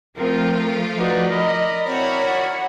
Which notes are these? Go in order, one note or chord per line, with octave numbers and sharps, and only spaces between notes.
F3 A3 C4 F4 A#4
D#4 F#4 B4 D5
A#4 D5 D#5 B5
C4 E4 F#4 C#5
F#5